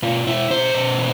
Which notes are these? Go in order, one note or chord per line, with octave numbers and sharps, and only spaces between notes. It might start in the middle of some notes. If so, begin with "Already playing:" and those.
B2 F4
B2 E4
B2 C5
B2
E3